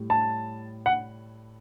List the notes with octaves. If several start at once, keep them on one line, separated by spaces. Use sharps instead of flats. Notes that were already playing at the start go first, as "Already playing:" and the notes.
Already playing: A2 G3
A5
F#5